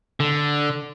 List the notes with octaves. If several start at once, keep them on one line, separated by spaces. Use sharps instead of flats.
D3